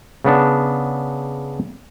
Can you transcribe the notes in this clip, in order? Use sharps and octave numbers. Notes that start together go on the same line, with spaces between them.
C#3 B3 D4